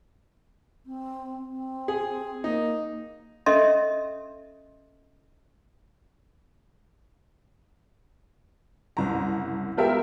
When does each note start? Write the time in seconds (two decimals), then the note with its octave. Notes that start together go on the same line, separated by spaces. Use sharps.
0.86 C4
1.51 C4
1.88 G#4
2.44 A#3 D#4
3.46 C#4 A4 D#5 E5 C6
8.97 F#1 C2 A#5
9.77 G#3 B3 F4 G4 A#4 E5